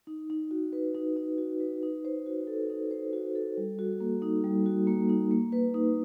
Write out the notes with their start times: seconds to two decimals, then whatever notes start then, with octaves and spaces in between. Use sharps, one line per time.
0.07 D#4
0.30 D#4
0.51 F#4
0.73 B4
0.95 D#4
1.16 D#4
1.38 F#4
1.60 B4
1.83 D#4
2.05 C5
2.26 F#4
2.47 A4
2.70 D#4
2.91 C5
3.13 F#4
3.35 A4
3.57 G3
3.79 F#4
4.00 A#3
4.22 D#4
4.44 G3
4.66 F#4
4.87 A#3
5.09 D#4
5.31 A#3
5.52 B4
5.74 D#4